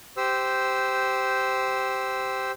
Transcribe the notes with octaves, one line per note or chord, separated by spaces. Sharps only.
G4 C5 E6